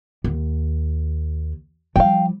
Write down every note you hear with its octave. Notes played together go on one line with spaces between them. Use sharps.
D#2
F3 G3 F5 G5